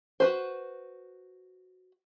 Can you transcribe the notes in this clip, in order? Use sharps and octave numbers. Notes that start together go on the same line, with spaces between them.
F#4 B4 C5